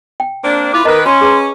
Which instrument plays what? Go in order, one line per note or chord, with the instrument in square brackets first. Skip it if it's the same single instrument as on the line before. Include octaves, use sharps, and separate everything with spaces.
[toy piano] G5
[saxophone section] A#3 C4 D4
[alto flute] E4 [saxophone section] F4 B4 [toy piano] D6
[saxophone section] D#3 B4 [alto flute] A#4 [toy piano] D#5 A#5
[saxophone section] C#4 [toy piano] F4 [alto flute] C6
[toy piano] G#4 B4 A#5